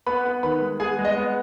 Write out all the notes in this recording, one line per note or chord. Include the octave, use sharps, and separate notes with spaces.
B3 B4 B5
B3
D#3 B4 B5
G#3
B3 G#4 G#5
G#3
D#5
B3